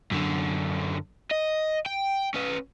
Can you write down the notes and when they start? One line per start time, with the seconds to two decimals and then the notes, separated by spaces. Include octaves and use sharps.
0.12 F#2 D3
1.31 D#5
1.86 G5
2.34 C#4 B4